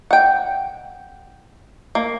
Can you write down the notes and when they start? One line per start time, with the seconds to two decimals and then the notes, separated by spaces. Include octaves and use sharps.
0.11 F#5 G5
1.95 A#3